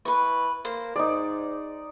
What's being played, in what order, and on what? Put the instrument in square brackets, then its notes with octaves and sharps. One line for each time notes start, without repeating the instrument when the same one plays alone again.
[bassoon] E3 [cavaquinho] B4 C#6
[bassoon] A#3 [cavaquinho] C5
[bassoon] G#2 [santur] D#4 D5